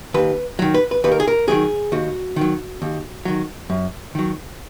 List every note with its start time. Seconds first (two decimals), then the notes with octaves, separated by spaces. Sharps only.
0.14 D#2 B4
0.59 D#3 F#3
0.74 B4
0.91 B4
1.04 D#2 B4
1.12 A#4
1.20 G#4
1.28 A#4
1.48 D#3 F#3 G#4
1.92 D#2 F#4
2.36 D#3 F#3
2.82 D#2
3.25 D#3 F#3
3.70 F#2
4.15 D#3 F#3